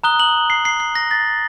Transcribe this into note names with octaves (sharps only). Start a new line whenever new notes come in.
A#5 D#6 F#6 G7
F#7
C7
C7
C7
A#6
A6